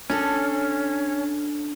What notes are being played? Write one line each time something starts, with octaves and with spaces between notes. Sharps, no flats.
C#4 D4 A4